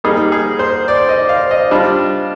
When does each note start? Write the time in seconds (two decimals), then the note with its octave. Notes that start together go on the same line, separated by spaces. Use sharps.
0.04 G3 A#3 D#4 G#4
0.32 G#4
0.59 C5
0.88 D5
1.09 D#5
1.29 F5
1.51 D#5
1.71 G3 D4 F4